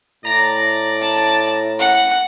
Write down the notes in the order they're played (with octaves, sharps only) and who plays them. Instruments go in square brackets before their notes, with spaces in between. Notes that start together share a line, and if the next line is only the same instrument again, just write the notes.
[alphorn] A2 [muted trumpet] D5 [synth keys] A#5 A#6
[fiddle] A5
F#5